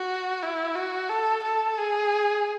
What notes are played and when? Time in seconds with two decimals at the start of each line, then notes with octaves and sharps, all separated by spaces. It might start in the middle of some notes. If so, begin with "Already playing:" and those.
Already playing: F#4
0.43 E4
0.76 F#4
1.10 A4
1.43 A4
1.78 G#4